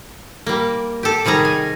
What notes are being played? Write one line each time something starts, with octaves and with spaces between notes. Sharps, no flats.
G3 A#3
G4 A4
C3 D#3 G3 G#4 A#5
G#5